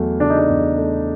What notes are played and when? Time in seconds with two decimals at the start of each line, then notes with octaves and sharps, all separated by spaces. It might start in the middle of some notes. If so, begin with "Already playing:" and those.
Already playing: E2 F#3 A3
0.20 C#3 D4
0.30 D#4
0.39 D4
0.49 E2
0.78 A3